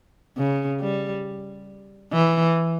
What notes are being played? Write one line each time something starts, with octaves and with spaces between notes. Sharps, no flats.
C#3
G3
E3